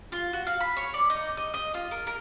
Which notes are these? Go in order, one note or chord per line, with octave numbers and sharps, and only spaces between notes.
F4
F#4
F5
B5
C#5
D5
D#4
D#5
D#5
F4
A#4
A#4